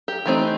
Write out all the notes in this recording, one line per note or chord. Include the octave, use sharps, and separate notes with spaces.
G4
E3 A3 C4 D#4